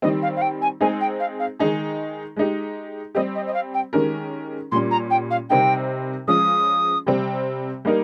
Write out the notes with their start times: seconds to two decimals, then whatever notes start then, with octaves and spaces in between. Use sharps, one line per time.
0.02 D#3 G3 C4 D#5
0.22 F5
0.36 F5
0.41 G5
0.61 G#5
0.81 G#3 C4 D#4 G#4 G#5
1.00 G5
1.20 F5
1.39 F5
1.59 D#3 G#3 D#4 G#4
2.37 G#3 D#4 G4
3.15 G3 C4 G4 D#5
3.35 D#5
3.47 D#5
3.54 F5
3.74 G5
3.93 D#3 G#3 C#4 G4 A#4
4.71 A#2 G3 C#4 C6
4.91 A#5
5.10 G5
5.30 F5
5.50 C3 G3 C4 D#4 A#4 G5
6.28 F3 G#3 C#4 F4 D#6
7.06 C3 G3 C4
7.85 G3 A#3 D#4 A#4